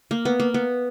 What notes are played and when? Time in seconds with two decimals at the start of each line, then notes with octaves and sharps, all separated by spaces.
0.11 A#3
0.25 B3
0.40 A#3
0.54 B3